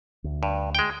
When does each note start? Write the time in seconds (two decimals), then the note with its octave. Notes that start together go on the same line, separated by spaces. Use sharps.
0.24 D2
0.43 G2
0.75 G#3 G5